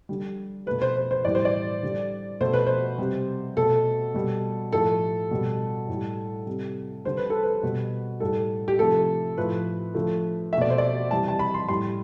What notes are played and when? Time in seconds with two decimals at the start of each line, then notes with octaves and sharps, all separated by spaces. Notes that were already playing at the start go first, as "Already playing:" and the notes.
0.09 D3 G3
0.66 B2 A3 B4
0.82 C5
0.96 C5
1.11 C5
1.25 A2 E3 G3 D5
1.35 C5
1.45 D5
1.83 D3 G3
2.41 B2 A3 C5
2.53 B4
2.67 C5
2.98 C3 G3
3.57 B2 A3 A4
4.14 B2 G3
4.73 A2 F3 A3 A4
5.31 B2 G3
5.89 A2 G3
6.47 C3 G3
7.04 D3 G3 C5
7.17 B4
7.30 A4
7.43 B4
7.63 B2 G3
8.20 A2 G3 A4
8.68 G4
8.79 C3 F3 A3 A4
9.37 A2 F3 A3 B4
9.95 D3 F3 A3
10.52 A3 E5
10.58 B2 D5
10.70 C5
10.78 D5
11.11 C3 E3 G3 A5
11.28 A5
11.39 B5
11.54 C6
11.69 A2 G3 C6